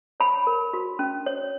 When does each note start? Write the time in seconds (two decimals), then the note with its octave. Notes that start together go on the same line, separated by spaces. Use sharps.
0.20 C#5 B5
0.47 A#4
0.73 F#4
0.99 C#4
1.26 C#5